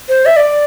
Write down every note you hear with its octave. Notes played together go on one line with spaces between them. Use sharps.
C5
E5
D5